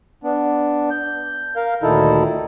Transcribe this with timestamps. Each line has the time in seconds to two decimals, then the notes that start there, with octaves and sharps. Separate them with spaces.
0.24 B3 D4
0.90 G6
1.56 A#4 F5
1.82 D2 A#2 D#3 D#4 E4 A4